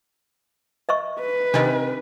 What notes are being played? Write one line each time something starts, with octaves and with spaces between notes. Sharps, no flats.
D#5 E5 C#6
B4
C3 D#3 D4 D#5